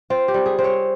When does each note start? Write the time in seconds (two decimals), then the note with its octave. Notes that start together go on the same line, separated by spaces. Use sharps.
0.10 C4 F4
0.28 G4
0.34 G3
0.46 G#4
0.58 C4
0.64 C#5